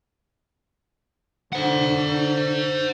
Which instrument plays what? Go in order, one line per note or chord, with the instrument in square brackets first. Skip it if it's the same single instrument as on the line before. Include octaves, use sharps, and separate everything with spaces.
[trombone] D3 [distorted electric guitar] C5 F#5